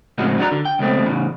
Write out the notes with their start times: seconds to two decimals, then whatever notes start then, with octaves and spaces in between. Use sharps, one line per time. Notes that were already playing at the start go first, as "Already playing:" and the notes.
0.18 A2 C#3 F3 G#3 C4 F#4
0.38 F#3 G#3 D4 F#4 A#5
0.51 D3
0.65 G5
0.79 C#2 B2 A3 C4
1.05 E2 A2 C#3